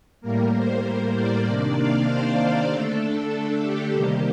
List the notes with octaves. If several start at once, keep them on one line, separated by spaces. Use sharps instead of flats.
A2 G3 A#3 A#4
C5
D5
C3 D#3 A#3 D4
F5
C5
D3 A3 D4 A4
A4
G4
C3 D#3 G3 A#3